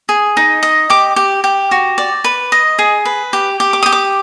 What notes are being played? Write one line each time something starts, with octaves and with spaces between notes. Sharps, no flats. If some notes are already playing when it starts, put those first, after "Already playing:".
G#4
D#4
D#5
G4 D6
G4
G4
F#4
D5
B4
D#5
G#4
B4
G4
G4
D6
G4 D#6
D6